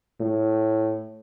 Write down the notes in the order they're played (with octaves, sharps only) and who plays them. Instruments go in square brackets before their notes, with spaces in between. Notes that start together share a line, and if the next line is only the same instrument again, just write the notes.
[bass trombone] A2